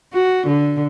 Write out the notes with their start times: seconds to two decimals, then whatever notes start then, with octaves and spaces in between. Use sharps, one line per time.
0.13 F#4
0.47 D3